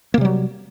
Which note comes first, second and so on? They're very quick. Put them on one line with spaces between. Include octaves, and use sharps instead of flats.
A#3 C3 G3 F#3